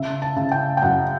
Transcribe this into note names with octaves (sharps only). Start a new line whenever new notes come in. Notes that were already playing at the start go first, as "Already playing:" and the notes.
Already playing: C#3 E5
A5
C#3
G5
G5
F#2 F#5